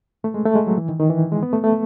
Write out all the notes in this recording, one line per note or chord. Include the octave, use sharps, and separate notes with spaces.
A3
G#3
A3
G#3
F#3
E3
D#3
D#3
E3
G#3
B3
A3
A3